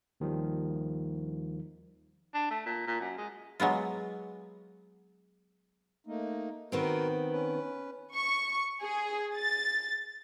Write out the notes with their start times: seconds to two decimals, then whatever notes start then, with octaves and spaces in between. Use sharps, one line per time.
0.20 D#2 D#3 F3 G3
2.34 D4
2.50 A3
2.66 A#2
2.87 A#2
3.01 F#2
3.18 G#3
3.60 F#3 G#3 B3 F4
6.07 A3 A#3 D#4
6.72 D#3 B3 C4 F#4 A#4 B4
7.31 C#4 B4
8.15 C#6
8.82 G#4
9.36 A6